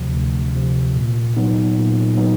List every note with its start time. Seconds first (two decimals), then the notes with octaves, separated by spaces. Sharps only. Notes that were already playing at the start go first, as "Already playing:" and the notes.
Already playing: D2 C3 F3
0.13 D2
0.55 C3 F3
0.96 A#2
1.37 F#3 B3 D#4
1.77 A#2
2.17 F#3 B3 D#4